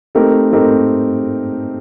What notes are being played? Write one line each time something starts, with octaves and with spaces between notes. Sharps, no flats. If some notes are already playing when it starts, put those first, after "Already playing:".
A3 C4 D#4 G4 A#4
A3 C4 D#4 G4 A#4